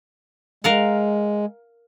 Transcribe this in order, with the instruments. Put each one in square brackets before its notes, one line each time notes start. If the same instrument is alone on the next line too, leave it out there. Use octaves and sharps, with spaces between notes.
[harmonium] G#3 [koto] A#4 F5 F#5